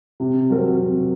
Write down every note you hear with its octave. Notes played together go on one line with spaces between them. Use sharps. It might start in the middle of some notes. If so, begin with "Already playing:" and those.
C3
F#3 C4 F#4 A#4
C3